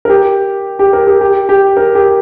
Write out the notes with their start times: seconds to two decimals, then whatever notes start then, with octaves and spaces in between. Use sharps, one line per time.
0.05 A#4
0.09 G4
0.79 G4
0.93 A#4
1.07 G4
1.21 G4
1.49 G4
1.77 A#4
1.95 G4